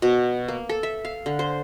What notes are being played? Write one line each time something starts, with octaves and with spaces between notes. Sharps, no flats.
B2
A#3
A4
E5
F5
D3
C5